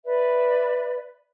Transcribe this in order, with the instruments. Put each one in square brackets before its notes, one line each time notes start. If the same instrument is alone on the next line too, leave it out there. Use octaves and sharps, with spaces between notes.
[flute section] B4 D5 E5